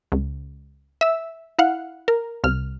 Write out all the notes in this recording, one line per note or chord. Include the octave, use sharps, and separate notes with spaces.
C#2
E5 E6
E4 F5 F#5
A#4
C2 F6